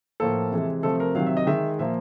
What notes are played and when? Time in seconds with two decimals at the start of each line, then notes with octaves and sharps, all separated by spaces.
0.20 A2 F3 A#3 A4
0.52 C3 E3 G#3
0.83 C3 F3 A3 A4
1.00 A#4
1.15 C3 D#3 F#3 F5
1.26 E5
1.37 D#5
1.47 D#3 G#3 E5
1.79 A#2 F3 A#3 E5